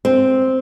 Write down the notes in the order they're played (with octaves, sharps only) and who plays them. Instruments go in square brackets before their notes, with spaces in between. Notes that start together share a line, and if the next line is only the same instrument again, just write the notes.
[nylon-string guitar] C4